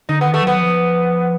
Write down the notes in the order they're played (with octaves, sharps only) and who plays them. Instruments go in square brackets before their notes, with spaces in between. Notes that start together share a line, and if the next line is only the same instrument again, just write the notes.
[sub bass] D3 [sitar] D#4
[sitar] B3
[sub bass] D#3
[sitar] A3
[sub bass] F#3 [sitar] B3
[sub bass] F3